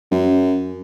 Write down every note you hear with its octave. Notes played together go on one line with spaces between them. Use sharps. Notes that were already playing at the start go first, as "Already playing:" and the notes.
F#2